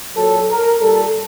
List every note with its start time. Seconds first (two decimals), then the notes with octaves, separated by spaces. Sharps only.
0.17 A#2 F#3 A4
0.50 A#4
0.81 A#2 G3 A4